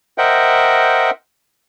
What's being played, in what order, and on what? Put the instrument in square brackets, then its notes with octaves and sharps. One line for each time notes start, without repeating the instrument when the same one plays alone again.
[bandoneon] A#4 C5 D#5 E5 F#5 G5